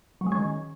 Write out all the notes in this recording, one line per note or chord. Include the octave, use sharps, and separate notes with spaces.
F#3
G#3
C#4
D#3